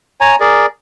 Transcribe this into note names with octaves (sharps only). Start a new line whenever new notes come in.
C#5 G#5 A#5
G#4 A#4 D5